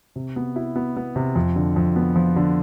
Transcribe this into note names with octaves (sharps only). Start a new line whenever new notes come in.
C3
B3
E4
B3
B3
C3
F2
D3
F2
B3
F3
D3